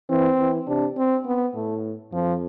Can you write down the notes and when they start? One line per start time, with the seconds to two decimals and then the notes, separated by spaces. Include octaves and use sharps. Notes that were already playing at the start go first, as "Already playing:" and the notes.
0.10 E3 C4
0.39 E3
0.67 C3 D4
0.97 C4
1.26 B3
1.55 A2 A3
2.13 F2 F3